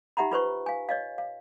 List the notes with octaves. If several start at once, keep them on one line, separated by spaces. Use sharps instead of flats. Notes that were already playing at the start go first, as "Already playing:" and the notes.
D#4 G4 E5 F#5 A#5 B5
F4 B4 C5 C#6
F5 G#5
C#5 D#5 F5
F5